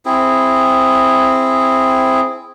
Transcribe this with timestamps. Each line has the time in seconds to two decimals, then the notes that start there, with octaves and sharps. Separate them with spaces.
0.05 C4 E4 G#4